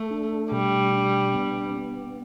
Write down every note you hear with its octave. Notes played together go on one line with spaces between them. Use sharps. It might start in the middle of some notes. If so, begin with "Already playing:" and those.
Already playing: A3 A4
D4
B2 G3
D4
B3
B3